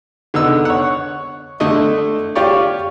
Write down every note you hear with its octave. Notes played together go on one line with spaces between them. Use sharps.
D3 B3 D#4 E6
C#5 F#5
D3 A3 D#5
F4 G4 C#5 D5